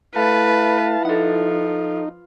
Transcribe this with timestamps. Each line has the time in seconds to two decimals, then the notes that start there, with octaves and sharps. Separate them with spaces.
0.16 A3 E4 B4 F5 A5
1.05 F3 D#4 A4 F#5